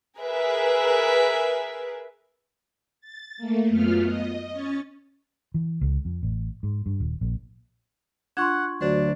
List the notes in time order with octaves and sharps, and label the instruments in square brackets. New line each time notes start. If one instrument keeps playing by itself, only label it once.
[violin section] G#4 A#4 B4 E5
[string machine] A6
A3 A#3
F#2 A3 B3 F4 F6
D#5
C#4 C#6 A6
[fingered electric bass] E3
C#2
F2
A1
G#2
G2
D#1
A#1
[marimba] D4 F4 [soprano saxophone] F#5 [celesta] C6 C#6 G#6
[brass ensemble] D2 F#3 [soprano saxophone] D4 [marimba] C5